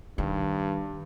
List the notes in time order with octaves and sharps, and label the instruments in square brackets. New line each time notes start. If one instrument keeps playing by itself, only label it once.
[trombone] G2 [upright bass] D#3